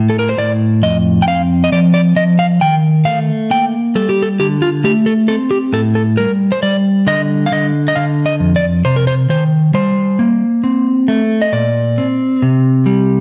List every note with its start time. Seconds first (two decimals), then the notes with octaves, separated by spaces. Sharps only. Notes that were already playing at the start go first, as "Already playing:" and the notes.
Already playing: A2
0.10 A4
0.19 A#4
0.29 C5
0.38 A2 D5
0.83 F2 D#5
1.22 G5
1.27 C4 F5
1.64 D#5
1.72 F3 D5
1.94 D5
2.16 F3 D#5
2.39 F5
2.61 D#3 G5
3.05 A3 F5
3.51 A#3 G5
3.95 G3 A4
4.09 G4
4.22 A4
4.40 D3 G4
4.62 F4
4.84 A3 G4
5.06 A4
5.28 C4 A4
5.51 G4
5.73 A2 A4
5.95 A4
6.17 G3 A#4
6.52 C5
6.63 G3 D5
7.07 D3 D#5
7.46 F5
7.52 D3 D#5
7.88 D#5
7.96 D3 F5
8.26 D#5
8.40 F2
8.56 D5
8.85 C3 C5
8.96 A#4
9.07 C5
9.29 D#3 C5
9.74 G3 C5
10.19 A#3
10.64 C4
11.08 A3
11.42 D#5
11.53 A#2 D5
11.98 C4
12.42 C3
12.86 G3